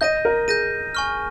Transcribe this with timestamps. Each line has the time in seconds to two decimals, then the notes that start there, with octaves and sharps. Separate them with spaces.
0.01 D#5 G6 A#6 D#7
0.25 A#4
0.48 G#4 G6 A#6 D#7
0.95 G#5 C#6 F6